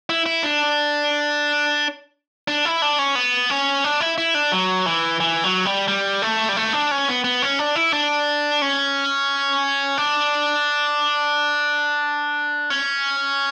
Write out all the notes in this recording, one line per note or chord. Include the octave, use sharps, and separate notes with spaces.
E4
E4
D4
D4
E4
D4
C#4
B3
C#4
D4
E4
E4
D4
F#3
E3
E3
F#3
G3
G3
A3
G3
A3
D4
C#4
B3
B3
C#4
D4
E4
D4
C#4
D4
C#4